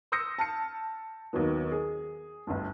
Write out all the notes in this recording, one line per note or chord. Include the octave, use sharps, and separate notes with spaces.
C6 D#6 E6 G6 A#6 C#7
A5 F6 C#7
D#2 D#3 F#3 B3
G#4
G1 D2 G2